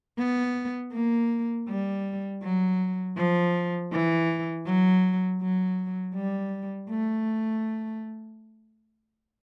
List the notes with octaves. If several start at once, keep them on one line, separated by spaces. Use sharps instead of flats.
B3
A#3
G3
F#3
F3
E3
F#3
F#3
G3
A3